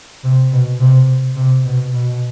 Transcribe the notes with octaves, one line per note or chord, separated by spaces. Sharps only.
C3
B2
C3
C3
B2
B2